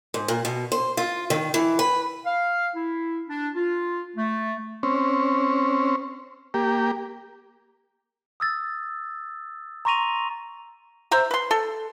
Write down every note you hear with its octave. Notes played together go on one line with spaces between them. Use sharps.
G#2
A#2
B2
C5
F4
D#3
E3
B4
F5
E4
D4
F4
A3
C4 C#4
A#3 G4
D#6 E6 A6
A#5 C6 C#6 A#6 D#7 F7
C5 E5 A#5
B4 C6
A4